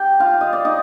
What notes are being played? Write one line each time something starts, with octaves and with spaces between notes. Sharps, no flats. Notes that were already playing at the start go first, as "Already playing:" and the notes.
Already playing: G4 G5
F4 F5
D#5
D5
D#4 D#5